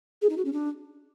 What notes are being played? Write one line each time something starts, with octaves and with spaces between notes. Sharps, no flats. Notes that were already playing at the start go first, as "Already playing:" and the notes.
G#4
D#4
F#4
C#4
D4